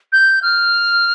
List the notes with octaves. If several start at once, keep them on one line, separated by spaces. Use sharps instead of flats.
G6
F6